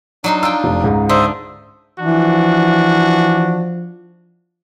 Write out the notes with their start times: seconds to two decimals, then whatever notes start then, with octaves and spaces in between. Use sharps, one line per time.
0.24 F#3 D4 D#4 C6
0.43 F4 G5 E6
0.64 F1
0.84 C#2 G#2
1.09 D3 C5 E5 D#6
2.00 E3 F3 D4 F#4